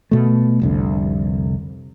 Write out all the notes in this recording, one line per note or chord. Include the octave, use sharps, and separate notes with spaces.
B2 A3
F1 C2 D3